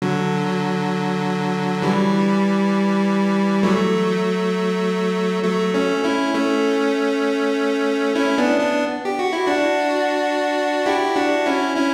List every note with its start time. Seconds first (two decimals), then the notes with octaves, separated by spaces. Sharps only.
0.02 D3 F#3
1.82 E3 G3
3.63 F#3 A3
5.44 F#3 A3
5.74 A3 C#4
6.04 C#4 E4
6.34 A3 C#4
8.15 C#4 E4
8.38 B3 D4
8.60 B3 D4
9.05 G4
9.19 F#4
9.33 E4
9.47 D4 F#4
10.86 E4 G4
11.16 D4 F#4
11.46 C#4 E4
11.76 C#4 E4